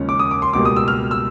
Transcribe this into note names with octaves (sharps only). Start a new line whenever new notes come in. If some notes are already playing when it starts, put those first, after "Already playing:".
Already playing: D#2 C#3 F3 G#3 C#4
D6
D#6
D6
C6
C#2 B2 G3 A#3 D6
D#6
E6
F6
E6